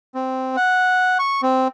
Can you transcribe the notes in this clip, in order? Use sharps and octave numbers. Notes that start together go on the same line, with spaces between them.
C4
F#5
C#6
C4